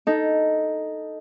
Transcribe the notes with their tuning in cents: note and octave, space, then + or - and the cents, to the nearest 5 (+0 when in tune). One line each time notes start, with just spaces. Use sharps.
D#4 +0 A4 +0